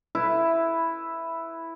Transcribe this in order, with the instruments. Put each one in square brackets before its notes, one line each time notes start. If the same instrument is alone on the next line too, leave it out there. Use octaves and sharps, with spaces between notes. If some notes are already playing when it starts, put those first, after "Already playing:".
[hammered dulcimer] E4 B4